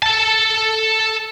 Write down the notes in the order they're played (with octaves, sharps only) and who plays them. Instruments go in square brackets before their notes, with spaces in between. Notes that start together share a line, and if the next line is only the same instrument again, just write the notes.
[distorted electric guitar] A4 A5